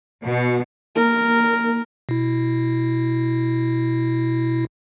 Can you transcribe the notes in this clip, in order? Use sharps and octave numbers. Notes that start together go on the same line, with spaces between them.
B2
A#3 A#4
B2 E4